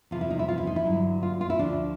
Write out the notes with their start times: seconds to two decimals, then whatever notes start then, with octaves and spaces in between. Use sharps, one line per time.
0.11 E2 C3 F3 F4
0.21 E4
0.30 D#4
0.39 E4
0.48 F4
0.58 E4
0.67 D#4
0.76 E4
0.85 G2 D3 F#3
1.23 F4
1.41 F4
1.50 E4
1.59 D2 D3 F3 D4